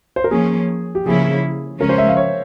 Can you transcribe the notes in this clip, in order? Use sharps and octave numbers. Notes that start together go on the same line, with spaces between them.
C5
A#4
F3 A#3 C#4 G#4
G4
C#3 F3 A#3 C#4 E4 G#4
C#3 F3 G#3 C#4 A#4
C5
E5
F5
C#5